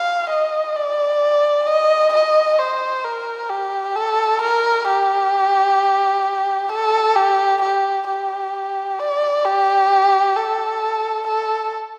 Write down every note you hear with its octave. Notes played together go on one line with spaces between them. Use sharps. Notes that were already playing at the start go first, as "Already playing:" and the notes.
Already playing: F5
D#5
D5
D#5
D#5
C5
A#4
G4
A4
A#4
G4
A4
G4
G4
G4
D5
G4
A4
A4